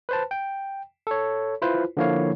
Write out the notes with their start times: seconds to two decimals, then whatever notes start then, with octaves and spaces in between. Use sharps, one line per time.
0.09 B4 C5 A5
0.31 G5
1.07 A4 C#5
1.62 E4 F4 B4 C5
1.97 D3 F3 A#3 E4 C#5 F5